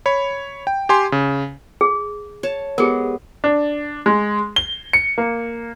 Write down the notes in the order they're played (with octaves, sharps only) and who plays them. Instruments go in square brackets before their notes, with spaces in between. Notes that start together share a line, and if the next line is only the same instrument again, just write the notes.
[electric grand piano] C#5 B5
G5
G4 G#5 C6
C#3
[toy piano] G#4
[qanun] C#5 A5
[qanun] G#3 B3 [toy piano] G4 G#4 A#4
[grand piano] D4
G#3
G7
C#7
A#3